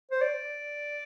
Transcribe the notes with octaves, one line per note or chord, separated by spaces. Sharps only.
C5
D5